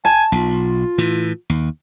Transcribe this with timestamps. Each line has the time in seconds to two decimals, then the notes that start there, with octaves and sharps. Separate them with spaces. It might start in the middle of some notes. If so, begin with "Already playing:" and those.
0.05 G#5 A5
0.32 B1 F4
0.98 A2 E3
1.50 D#2